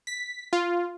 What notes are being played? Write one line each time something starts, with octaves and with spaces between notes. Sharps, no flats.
B6
F4